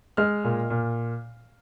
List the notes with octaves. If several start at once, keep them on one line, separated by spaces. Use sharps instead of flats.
G#3 F6
A#2
A#2